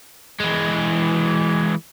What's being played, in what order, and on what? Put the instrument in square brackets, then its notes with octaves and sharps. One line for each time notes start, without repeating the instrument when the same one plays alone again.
[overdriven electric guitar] E3 G#3